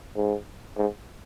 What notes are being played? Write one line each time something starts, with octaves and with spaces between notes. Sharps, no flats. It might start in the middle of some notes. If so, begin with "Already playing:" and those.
G#2
G#2